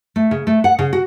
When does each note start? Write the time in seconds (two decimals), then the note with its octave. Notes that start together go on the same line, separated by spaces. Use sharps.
0.16 A3
0.31 C#3
0.47 A3
0.64 F#5
0.79 C#3
0.93 F#4